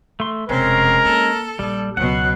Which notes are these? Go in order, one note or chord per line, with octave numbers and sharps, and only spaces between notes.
A3 C6
F1 B2 G#3 C4 C#4 A#4
A#3 A4
A#1 G3
C#2 B2 F#3 F#5 F#6